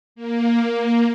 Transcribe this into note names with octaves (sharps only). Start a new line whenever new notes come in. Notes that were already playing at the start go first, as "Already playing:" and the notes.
A#3